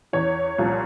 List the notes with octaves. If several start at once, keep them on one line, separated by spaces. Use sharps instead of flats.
E2 E3 C#5
C2 A#2 F3